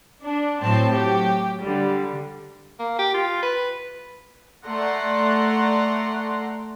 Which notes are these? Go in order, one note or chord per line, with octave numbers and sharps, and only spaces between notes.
D4
A2 F#3 C4 A5
F#3 G4
D3 G3
A#3
G4
F4
B4
A3 D5 F#5 A#5 C6